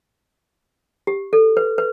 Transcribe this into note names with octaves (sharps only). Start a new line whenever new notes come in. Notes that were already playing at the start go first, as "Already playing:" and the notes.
G4
A4
B4
B4